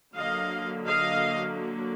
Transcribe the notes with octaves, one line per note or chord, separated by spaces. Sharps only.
D3 F#3 A#3 D#5 F5
D#5 F5